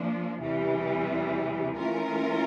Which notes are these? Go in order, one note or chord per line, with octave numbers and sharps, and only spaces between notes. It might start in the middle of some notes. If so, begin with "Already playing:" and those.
Already playing: F3 A#3 D4
E2 C3 E3 G3
E3 A3 C#4 F4 A#4